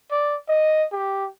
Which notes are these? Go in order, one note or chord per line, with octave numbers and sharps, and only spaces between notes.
D5
D#5
G4